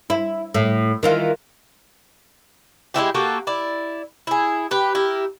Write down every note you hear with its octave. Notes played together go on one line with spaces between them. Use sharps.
E4
A2
D#3 E3 F4
G#3 A3 E4 G4
A#3 F#4 G4 A4
E4 D5
E4 G#4
G4 B4
E4 G4 A#4